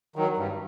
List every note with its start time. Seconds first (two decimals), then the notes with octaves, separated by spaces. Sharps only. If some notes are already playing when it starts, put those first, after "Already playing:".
0.16 D#3 F#3
0.37 G2